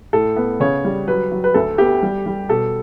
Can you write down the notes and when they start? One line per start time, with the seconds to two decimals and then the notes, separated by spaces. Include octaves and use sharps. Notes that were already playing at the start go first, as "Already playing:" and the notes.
0.13 A2 A4
0.36 B3
0.60 C#3 C#5
0.85 G3
1.08 F#3 B4
1.31 F#3
1.44 B4
1.54 D2 A4
1.78 B3 G4
2.03 G3
2.26 G3
2.49 B2 A4